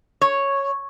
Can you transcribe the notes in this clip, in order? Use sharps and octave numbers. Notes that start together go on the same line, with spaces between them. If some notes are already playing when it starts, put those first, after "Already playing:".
C#5